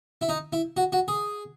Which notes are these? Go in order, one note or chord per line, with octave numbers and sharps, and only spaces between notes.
E4
D#4
E4
F#4
F#4
G#4